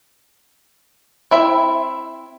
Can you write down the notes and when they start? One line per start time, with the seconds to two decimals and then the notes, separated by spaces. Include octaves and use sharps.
1.31 C4 E4 E5